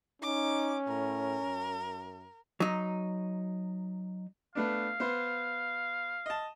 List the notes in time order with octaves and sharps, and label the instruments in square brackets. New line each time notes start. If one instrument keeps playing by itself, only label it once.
[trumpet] C#4 [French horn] D#4 [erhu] D6
[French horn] A2 [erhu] A#4
[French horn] F#2
[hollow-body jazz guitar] F#3 D#4
[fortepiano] A3 B3 D4 [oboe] F5
[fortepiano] B3 C5
D#5 A5